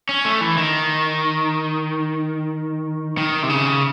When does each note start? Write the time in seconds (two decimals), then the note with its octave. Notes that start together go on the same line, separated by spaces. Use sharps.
0.09 C#4
0.25 A3
0.41 E3
0.57 D#3
3.17 D#3
3.43 C3
3.49 C#3